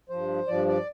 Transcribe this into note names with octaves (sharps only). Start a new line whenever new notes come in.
G2 F3 C5
G2 F3 D5
D5